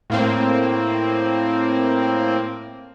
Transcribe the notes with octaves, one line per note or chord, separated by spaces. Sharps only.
A2 A#3 C4